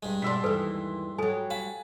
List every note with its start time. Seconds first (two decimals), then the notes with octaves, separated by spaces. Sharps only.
0.03 G2 G#3
0.22 B2 D5 C6 E6 B6
0.44 D#2 E3 A4 B4
1.18 F#3 G3 A4 G#5
1.50 F5 G#5 A5 B5